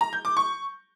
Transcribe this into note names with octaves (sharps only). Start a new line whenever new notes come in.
A#5
G6
D6
C#6